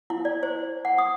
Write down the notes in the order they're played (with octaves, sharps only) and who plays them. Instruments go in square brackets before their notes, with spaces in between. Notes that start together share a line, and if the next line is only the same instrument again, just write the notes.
[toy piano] E4
D5
C5
F#5
D#6